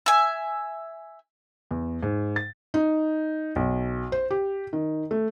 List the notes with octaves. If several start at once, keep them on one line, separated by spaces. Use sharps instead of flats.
E5 G#5
E2
G#2
A6
D#4
B1
C5
G4
D#3
A3